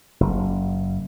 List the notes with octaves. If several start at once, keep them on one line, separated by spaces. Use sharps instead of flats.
F#1